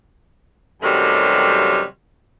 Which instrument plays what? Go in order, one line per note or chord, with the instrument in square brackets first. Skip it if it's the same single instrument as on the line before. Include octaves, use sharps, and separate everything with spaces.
[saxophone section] F#2 C3 D#3 F#3 G3 A3